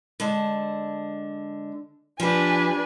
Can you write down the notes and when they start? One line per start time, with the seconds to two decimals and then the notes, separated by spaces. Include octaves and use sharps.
0.20 D3 G#3 A5
2.20 F3 D4 G4 B4 G#5